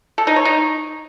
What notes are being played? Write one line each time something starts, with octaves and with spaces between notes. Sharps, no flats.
A4
D#4
C#5
D#4